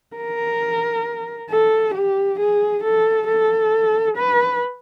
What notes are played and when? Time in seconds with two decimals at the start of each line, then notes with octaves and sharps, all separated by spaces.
0.16 A#4
1.50 A4
1.94 G4
2.39 G#4
2.83 A4
3.28 A4
4.17 B4